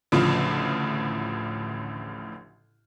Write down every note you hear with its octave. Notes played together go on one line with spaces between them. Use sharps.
A1 D2 A2 C#3 F3